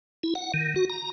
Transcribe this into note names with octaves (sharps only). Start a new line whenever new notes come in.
E4
F#5
D#3
F#4
A#5